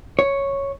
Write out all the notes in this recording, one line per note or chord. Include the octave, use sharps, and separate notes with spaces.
C#5